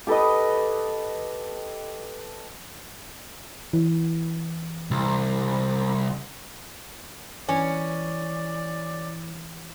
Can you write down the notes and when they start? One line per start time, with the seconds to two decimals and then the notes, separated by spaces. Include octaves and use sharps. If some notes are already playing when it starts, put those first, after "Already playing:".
0.07 G4 A4 B4 D#5
3.73 E3
4.91 C2
7.49 E3 C#4 D5